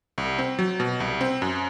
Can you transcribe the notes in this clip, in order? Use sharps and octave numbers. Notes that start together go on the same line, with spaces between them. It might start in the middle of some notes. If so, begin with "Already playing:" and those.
C2
C4
F#3
B2
C2
C4
F#2